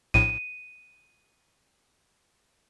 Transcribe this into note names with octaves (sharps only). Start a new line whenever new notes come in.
A#1 A2 D#7